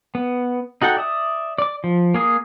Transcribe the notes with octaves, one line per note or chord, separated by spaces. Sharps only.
B3
D#4 F#4 A4 F#5 G5
D5 E5 D#6
D5 D6
F3
A#3 G#4 D#6